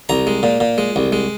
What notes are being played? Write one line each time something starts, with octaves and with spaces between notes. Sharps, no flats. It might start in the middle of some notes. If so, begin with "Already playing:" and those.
C2 A#5
G#3
A#2
A#2
G#3
C2
G#3